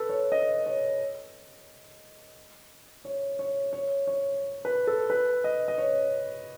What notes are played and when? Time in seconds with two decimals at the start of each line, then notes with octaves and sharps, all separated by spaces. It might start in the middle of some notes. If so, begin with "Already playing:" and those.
Already playing: A4 B4
0.09 C#5
0.32 D#5
0.66 C#5
3.05 C#5
3.39 C#5
3.73 C#5
4.07 C#5
4.65 B4
4.87 A4
5.10 B4
5.44 D#5
5.68 D#5
5.78 C#5